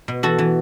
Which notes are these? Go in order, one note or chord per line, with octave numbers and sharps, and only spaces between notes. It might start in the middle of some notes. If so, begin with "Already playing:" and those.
B2
E3 F#4 A4
E3